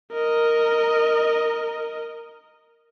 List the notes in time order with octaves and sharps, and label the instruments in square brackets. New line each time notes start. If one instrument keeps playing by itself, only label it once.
[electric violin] A#4 D#5